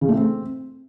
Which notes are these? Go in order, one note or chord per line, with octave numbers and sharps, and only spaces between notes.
C#3
A3
C4